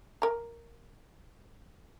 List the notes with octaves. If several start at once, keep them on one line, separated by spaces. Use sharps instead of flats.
A#4 A#5